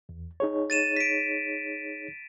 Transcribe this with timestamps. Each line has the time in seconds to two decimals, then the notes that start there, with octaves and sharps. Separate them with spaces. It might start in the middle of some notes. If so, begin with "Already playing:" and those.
0.09 E2
0.40 D#4 G#4 C#5
0.70 A6 D#7 E7
0.96 B6 D7